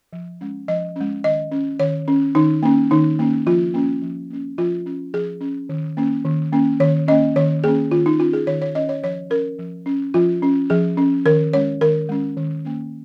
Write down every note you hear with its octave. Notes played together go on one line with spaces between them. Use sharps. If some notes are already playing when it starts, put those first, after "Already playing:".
F3
G#3 C#4
F3 D#5
G#3 C#4
D#3 D#5
C#4
D#3 C#5
C#4
D#3 D#4
A#3 C#4
D#3 D#4
A#3 C#4
F3 F4
A#3 C#4
F3
A#3 C#4
F3 F4
C#4
F3 G#4
C#4
D#3
A#3 C#4
D#3
A#3 C#4
D#3 C#5
A#3 C#4 D#5
D#3 C#5
A#3 C#4 G#4
D#3 F4
D#4
C#4 F4
G#4
D#3 C#5
C#5
C#4 D#5
C#5
F3 C#5
C#4 A#4
F3
C#4
F3 F4
C#4
F3 G#4
C#4
D#3 A#4
G#3 C#4 C#5
D#3 A#4
G#3 C#4
D#3
A#3 C#4